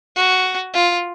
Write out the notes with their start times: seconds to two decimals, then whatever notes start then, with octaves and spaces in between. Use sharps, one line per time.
0.16 F#4
0.74 F4